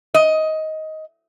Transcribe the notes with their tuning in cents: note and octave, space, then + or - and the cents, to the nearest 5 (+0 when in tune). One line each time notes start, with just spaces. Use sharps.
D#5 +15